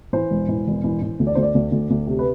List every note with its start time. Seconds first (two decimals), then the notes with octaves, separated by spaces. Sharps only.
0.13 E3 C5
0.31 E1
0.49 E3
0.67 E1
0.84 E3
1.02 E3
1.19 D2
1.27 D5
1.35 D2 C5
1.42 D5
1.55 D2
1.72 D2
1.90 D2
2.07 C3
2.19 B4